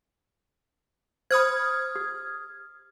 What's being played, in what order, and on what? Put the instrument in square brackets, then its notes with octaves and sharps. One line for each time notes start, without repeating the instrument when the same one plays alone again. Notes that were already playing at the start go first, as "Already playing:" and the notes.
[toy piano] C5 B5 [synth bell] D#6 F6 G#6
[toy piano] G4